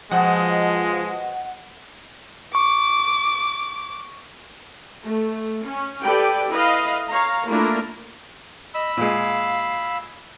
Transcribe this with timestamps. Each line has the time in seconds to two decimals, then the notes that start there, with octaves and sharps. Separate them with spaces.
0.11 B2 F3 G#3 C4 F#5
2.55 C#6 D6
5.02 A3
5.64 C#4
6.02 G4 A4 B4 D5 G5
6.49 E4 B4 D#5 F5
7.09 C#5 F5 A#5
7.48 A3 A#3 D4 E4 F4 A#4
8.74 D#5 B5 E6
8.97 A#2 G#3 F5